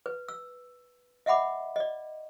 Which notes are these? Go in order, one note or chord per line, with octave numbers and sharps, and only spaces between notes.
B4
E6
D#5 E5 F#5 B5 D6
D5 D#5